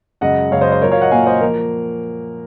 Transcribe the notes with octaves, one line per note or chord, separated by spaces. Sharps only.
F#2 C#3 G#3 D#5 F#5
F#2 C#3 G#3 C#5 F5
C5 D#5
C5 D#5
A#2 F#3 A#3 A#4 C#5
C#5 F5
D#5 F#5
A#2 F#3 A#3 F5 G#5
C5 D#5
F3 A#3 A#4